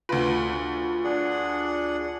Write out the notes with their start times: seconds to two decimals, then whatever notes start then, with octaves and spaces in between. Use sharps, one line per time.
0.09 D2 F4 B4
1.04 D4 G#4 F#5